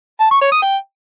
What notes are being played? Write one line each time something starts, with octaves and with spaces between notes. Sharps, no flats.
A5
C#6
C#5
D#6
G5